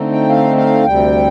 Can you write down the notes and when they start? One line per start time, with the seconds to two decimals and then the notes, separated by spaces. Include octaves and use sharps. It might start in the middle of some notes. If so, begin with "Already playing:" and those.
Already playing: D3 A3 C4 D#4
0.11 G5
0.29 F5
0.57 F5
0.84 D2 C3 G3 G5